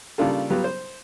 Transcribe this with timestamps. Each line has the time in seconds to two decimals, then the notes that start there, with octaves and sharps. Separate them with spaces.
0.18 C#3 G3 A#3 D4 F4 A4
0.50 F#3 G3 B3 F4 G4
0.64 C5